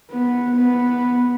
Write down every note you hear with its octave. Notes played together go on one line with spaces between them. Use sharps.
B3
B3